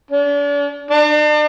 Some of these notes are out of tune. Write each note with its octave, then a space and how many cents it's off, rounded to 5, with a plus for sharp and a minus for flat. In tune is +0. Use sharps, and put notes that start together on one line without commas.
D4 -40
D4 +40